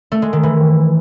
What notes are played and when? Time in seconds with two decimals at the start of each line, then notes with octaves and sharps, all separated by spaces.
0.12 A3
0.22 G#3
0.33 D#3
0.43 E3